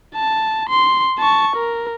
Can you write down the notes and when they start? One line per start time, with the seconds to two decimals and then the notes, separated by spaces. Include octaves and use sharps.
0.15 A5
0.69 C6
1.18 A5 C#6
1.56 A#4